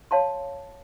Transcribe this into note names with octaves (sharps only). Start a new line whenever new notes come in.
C#5 F5 A5 C6